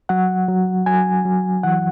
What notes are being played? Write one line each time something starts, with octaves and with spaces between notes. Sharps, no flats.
F#3 F#5
F#3
F#3 G#5
F#3
E3 F#5